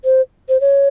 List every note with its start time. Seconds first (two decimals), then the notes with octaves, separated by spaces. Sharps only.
0.04 C5
0.49 C5
0.61 C#5